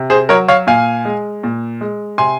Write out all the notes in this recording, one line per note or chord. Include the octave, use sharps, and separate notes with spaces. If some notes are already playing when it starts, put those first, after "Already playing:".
Already playing: C3
G#4 C5
F#3 A#4 C#5
C#5 F5
A#2 F5 G#5
G#3
A#2
G#3
C3 G#5 C6